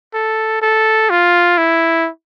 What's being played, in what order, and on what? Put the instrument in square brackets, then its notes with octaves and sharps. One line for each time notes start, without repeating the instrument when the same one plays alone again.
[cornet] A4
A4
F4
E4